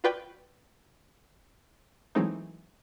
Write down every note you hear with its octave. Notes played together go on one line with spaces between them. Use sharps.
F4 F#4 B4 D5 G5
E3 F#3 G#3 A3 C4 D#4